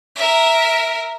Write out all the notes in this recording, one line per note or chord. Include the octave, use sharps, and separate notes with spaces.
A#4 E5